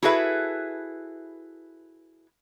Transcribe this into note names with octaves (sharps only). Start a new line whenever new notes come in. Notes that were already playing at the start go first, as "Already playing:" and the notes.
E4 F#4 G#4 A4 B4 E5